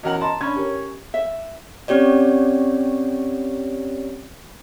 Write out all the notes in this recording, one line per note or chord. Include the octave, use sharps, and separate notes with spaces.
E2 C#4 F#4 A#4 D#5 F#5
D#5 A5 A#5 C6
C#4 D4 B5 G#6
G4 A#4 C#5
E5
C4 C#4 G4 C#5 D5